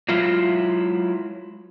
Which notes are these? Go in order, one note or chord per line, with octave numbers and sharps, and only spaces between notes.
F#3 G#3 E4 F4